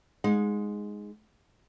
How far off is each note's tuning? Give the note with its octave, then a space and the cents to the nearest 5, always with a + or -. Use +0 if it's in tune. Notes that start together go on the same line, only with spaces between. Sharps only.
G#3 +0 D#4 +0 F#5 -40